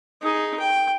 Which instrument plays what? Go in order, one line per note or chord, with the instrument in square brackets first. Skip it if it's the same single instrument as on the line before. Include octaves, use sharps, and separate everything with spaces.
[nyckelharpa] D#4 G#4
G5